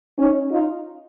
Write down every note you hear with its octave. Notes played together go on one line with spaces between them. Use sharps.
C#4 D#4
D#4 F4